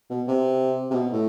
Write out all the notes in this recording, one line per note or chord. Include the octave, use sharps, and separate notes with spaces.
B2
C3
C3
B2
A2